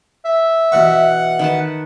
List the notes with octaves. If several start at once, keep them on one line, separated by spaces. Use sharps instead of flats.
E5
B2 E3 F#5 C#6
D#3 B4 A5